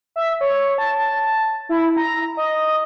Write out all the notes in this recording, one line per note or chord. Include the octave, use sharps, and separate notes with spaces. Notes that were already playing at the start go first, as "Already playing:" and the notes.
E5
C#5
A5
A5
E4
A#5
D#5